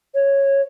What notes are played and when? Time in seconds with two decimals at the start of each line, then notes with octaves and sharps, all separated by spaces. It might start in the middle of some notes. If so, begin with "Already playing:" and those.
0.15 C#5